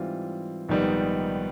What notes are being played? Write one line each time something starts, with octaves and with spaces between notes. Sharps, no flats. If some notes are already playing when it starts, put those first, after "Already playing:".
Already playing: G#2 E3 G3 C4 F4
A#1 G#2 D#3 G3 B3